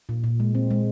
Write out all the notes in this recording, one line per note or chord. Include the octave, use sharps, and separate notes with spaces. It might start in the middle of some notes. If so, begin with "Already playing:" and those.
A#2
A#2
G#3
C4
G#3